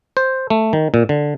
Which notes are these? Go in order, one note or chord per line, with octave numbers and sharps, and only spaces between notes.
C5
A3
D#3
A#2
D3